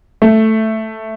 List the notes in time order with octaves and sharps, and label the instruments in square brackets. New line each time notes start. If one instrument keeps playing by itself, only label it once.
[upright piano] A3